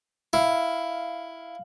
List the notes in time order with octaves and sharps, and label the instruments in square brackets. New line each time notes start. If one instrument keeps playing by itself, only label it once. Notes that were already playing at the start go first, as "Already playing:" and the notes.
[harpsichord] E4 [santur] F5